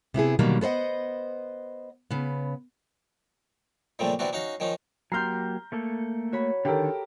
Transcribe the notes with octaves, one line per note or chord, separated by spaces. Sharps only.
C3 B3 E4 G#4
B2 D3 D#3 F#3 G3 A#3
B3 A4 C5 D#5 F#5
C#3 B3
A#2 C#3 F3 G3 A3 C4
C3 E3 C4 D4 F#4
C#4 D#4 F#4 F5
D#3 F3 C#4 D#4
F#3 A#3 G4 A#5 C6 F6 G6 C7
A3 A#3 A4
F#4 C#5 B5
D3 D#3 G4 A4 A#4